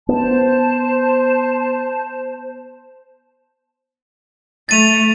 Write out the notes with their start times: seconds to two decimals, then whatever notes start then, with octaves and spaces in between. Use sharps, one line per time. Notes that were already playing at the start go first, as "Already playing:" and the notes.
0.09 B3 C5 A5
4.69 A3 A6 D#7 F7